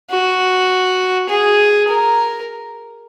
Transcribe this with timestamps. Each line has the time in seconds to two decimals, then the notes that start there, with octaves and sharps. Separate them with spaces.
0.11 F#4
1.29 G#4
1.88 A#4